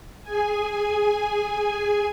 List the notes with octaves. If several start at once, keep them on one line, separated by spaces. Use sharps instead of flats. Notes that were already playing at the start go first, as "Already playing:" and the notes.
G#4 G#5